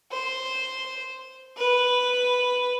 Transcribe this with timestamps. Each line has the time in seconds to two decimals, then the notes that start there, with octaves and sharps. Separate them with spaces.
0.11 C5
1.57 B4